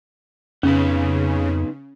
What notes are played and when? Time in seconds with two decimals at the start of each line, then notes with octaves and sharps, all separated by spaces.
0.63 F2 C#3 B3 C#4 D#4 B4